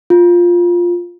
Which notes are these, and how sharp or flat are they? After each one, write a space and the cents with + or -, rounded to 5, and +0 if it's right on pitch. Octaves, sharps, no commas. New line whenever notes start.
F4 +5